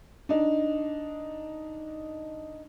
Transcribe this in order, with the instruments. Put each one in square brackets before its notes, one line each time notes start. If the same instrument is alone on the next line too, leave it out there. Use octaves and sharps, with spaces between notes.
[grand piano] D4 D#4